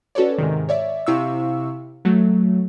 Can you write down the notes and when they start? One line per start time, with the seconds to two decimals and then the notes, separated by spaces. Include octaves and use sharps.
0.15 C#4 F#4 A4 B4 C#5 D5
0.38 G#2 C3 D#3
0.69 C#5 D5 E5
1.07 C3 E4 F5 C#6 E6
2.05 F#3 A3